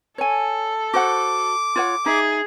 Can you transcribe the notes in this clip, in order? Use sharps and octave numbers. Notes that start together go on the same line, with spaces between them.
A4 C#5 G#5
F#4 C5 F#5 D6
F4 C#5 F#5
D#4 G#4 E5